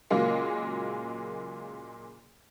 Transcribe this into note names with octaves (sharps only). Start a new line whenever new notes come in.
A#2 C#3 F#3 G#3 A#3